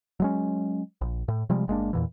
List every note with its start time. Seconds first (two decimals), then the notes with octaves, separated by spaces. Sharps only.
0.20 F#3 G#3 C#4
1.01 A#1
1.28 A2
1.50 C3 F3 G3 G#3
1.68 G1 G#3 A#3 D4
1.93 E2 A#2 E3